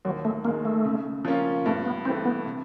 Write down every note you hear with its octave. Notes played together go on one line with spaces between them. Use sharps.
D#2 F#3
A3
D#3 G#3 A#3
A3
C#3
F3 A#3 C#4 F4
G2 A3
B3
E3 A3 C4
B3
C3